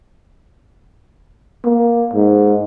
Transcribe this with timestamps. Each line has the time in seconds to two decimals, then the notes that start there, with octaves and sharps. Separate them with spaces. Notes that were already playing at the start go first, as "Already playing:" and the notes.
1.65 A#3
2.13 G#2